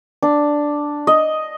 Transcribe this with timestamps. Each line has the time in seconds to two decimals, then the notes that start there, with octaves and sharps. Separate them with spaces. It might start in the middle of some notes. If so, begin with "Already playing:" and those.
0.23 D4
1.07 D#5